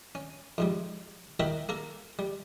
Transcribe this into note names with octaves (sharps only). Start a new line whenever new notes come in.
C#4
F2 G#2 G3
E4 F#4 A#4 D#5 E5 G5
A#3 A4 A#4
G3